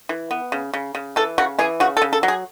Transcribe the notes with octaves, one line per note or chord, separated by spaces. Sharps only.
E3
B3
C#3
C#3
C#3
E3 A4
C#3 F#4
E3 G#4
C#3 F#4
A4
C#3
A4
F#3
G#4